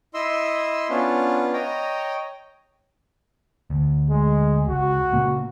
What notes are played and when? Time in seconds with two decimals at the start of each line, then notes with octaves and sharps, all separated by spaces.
0.14 E4 D#5 C6 E6
0.90 B3 C#4 D4 F4
1.53 C#5 D#5 G5 A#5
3.70 D2
4.10 G#3
4.68 C#2 F#4
5.12 A#2 C#3 A#3